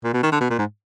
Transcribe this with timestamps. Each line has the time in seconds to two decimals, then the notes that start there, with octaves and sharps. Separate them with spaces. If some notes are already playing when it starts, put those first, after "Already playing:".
0.04 A#2
0.13 B2
0.23 D#3
0.32 D3
0.40 B2
0.50 A#2
0.59 G#2